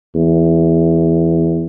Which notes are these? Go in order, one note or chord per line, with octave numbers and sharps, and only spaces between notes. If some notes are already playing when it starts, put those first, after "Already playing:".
E2